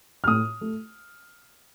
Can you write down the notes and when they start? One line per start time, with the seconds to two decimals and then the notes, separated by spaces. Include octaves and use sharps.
0.24 F6
0.28 A2 D#6
0.61 A3